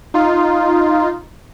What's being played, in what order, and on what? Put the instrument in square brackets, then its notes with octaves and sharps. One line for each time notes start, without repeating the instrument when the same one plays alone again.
[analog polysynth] D#4 F4